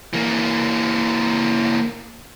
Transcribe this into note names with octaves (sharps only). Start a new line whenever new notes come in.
E3 A#3